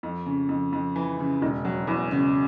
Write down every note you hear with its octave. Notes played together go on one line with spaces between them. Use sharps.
F2
C#3
F2
F2
E3
C#3
E1
F#3
E2
C#3